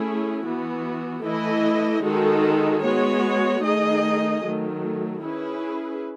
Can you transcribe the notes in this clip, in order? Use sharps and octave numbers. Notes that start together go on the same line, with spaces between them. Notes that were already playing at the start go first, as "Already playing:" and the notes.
Already playing: A3 C#4 E4 G#4
E3 B3 F#4
E3 A3 E4 A4 D#5
D#3 G#3 D#4 F#4 A4
G#3 B3 F#4 C#5
D#3 A3 D#4 G#4 D#5
D#3 F#3 A3
C#4 E4 G#4 B4